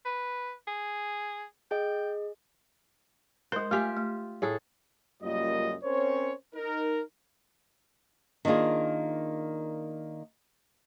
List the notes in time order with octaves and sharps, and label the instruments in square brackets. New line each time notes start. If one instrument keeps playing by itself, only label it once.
[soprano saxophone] B4
G#4
[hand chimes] G#4 D#5 [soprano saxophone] G5
[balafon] G#3 A#4 [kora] C5
[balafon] A3 G#5 [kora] F4 G4 E5
[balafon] A3
[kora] A2 G#4 A4
[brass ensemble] C#2 F#2 G3 A#3 F4 D#5
C4 C#4 A#4 C5 C#5
D#4 A#4
[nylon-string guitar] D#3 A#3 D4 F4 G#4